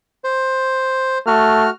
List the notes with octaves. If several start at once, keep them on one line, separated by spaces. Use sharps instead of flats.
C5
A3 F#4 F6